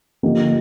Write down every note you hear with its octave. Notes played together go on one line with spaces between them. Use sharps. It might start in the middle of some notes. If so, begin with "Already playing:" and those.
D3 F3 A#3 D#4 G4